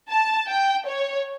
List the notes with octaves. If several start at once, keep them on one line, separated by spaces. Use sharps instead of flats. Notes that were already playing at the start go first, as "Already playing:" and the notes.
A5
G5
C#5